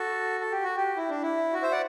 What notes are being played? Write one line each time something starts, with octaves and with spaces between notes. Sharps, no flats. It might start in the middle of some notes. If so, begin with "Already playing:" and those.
Already playing: F#4 A4
A4
G4
F#4
G4
E4
D4
E4
F#4
C5 E5
D5 F#5